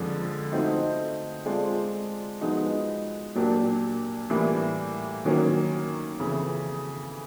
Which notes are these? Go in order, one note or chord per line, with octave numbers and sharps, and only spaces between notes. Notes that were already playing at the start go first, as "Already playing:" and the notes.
Already playing: F2 D3 F3 G#3
A3 C4 D#4 F#4
G#3 C4 F4 A4 D5
F3 G#3 B3 D#4 F#4
A#2 F#3 A#3 D4 G4
A2 E3 G3 A#3
D#3 F#3 A#3 C#4
F2 C#3 E3